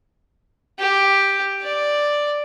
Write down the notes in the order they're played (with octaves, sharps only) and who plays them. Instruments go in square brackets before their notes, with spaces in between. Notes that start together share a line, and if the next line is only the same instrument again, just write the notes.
[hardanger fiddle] G4
D5